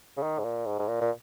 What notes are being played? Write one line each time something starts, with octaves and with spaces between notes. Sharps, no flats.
C#3
D#3
G#2
A#2
G#2
G#2
A#2
A#2